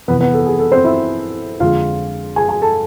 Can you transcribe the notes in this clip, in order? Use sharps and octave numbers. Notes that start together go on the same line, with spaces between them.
F2 C3 E3 B3 B4
B3 B4
A4
G#4
A4
C4 C5
E4 E5
F2 D3 G#3 F4 F5
G#4 G#5
G#4 G#5
A4 A5